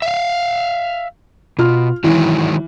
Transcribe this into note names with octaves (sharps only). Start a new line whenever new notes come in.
E5 F5
B2 F4 F6
D#3 E3 F#3 G#3